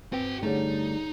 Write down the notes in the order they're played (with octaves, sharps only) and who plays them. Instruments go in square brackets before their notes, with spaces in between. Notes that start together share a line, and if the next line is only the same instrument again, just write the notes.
[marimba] G2 [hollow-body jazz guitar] C4 B4 [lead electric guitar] F#4 G5
[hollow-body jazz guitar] D3 G3 A3 [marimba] C#4 G#4 C#5 [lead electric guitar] D#4